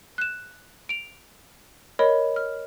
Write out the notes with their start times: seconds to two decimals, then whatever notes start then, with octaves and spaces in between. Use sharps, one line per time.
0.18 F#6 E7
0.89 D7 F7
1.99 A#4 C#5 D#5 B5
2.36 F6